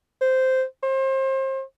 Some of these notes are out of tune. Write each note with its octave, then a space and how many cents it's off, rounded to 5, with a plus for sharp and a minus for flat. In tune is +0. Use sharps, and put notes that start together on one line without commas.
C5 -10
C5 +35